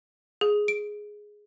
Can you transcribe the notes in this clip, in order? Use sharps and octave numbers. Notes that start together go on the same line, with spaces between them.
G#4
D7